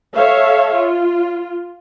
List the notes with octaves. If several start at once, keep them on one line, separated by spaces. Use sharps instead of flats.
A4 C#5 E5 F5
F4